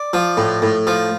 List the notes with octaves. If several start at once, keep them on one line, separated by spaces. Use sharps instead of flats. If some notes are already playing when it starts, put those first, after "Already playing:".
Already playing: D5
F3
A2
A2
F3